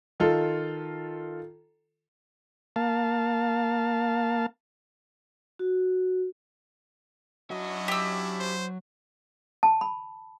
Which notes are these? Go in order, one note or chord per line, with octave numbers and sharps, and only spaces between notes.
D#3 F4 A4
A#3 F5 A5
F#4
F#3 C#4 D4 E4 F#4 D#5
G4 E6
C5
A5
B5